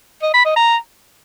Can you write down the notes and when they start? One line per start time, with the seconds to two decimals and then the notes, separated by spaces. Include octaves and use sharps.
0.23 D#5
0.34 B5
0.45 D#5
0.56 A#5